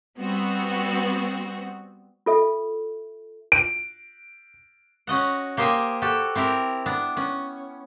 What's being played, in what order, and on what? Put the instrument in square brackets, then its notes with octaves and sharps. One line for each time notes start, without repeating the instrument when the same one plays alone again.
[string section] G3 B3 C4 F#4
[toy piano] F4 A4 E5
[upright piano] D7
[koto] C#4 F#4 D#5 F#5
A#3 G4 C5 D#5 G5 G#5
F#4 G4 A4
C4 E4 G4 A#4
B3 D4
B3 C#4